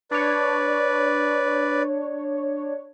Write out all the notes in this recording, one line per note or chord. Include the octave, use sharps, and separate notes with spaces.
D4 B4 C#5 D5